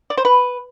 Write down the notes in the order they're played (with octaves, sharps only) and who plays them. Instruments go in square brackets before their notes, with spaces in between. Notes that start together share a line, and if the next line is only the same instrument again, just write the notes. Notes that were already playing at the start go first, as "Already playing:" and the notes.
[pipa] D5
C5
B4